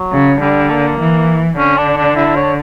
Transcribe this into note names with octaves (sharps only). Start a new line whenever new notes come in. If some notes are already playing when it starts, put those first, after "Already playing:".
Already playing: F#3
C#3
D3 G3
A#3
E3
D3 C#4
D4
D4
E4
C#5